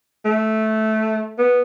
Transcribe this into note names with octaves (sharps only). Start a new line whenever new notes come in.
A3
B3